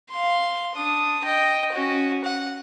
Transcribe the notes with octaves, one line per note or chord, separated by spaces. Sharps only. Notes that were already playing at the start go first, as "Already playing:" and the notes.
F5 C6
D4 D#6
D#5 G5
C#4 F#4
F#5